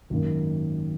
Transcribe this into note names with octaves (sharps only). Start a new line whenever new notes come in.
G#1 F#2 D#3 A#3